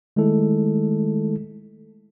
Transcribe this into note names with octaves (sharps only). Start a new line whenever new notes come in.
D#3 G#3 A3 E4 A4